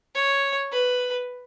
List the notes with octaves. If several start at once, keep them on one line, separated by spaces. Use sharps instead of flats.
C#5
B4